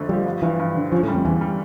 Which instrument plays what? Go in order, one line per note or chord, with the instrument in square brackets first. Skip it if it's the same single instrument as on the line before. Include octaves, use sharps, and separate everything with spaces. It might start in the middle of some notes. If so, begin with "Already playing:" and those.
Already playing: [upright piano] F2 D3 A3
[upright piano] F3 [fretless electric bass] G3
[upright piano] G2
[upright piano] G2 [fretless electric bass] E3
[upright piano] G2
D3
[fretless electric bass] F3 [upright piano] C#4
[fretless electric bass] A2
[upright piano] G3
[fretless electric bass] F2
[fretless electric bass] E2 [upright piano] E3
[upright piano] G3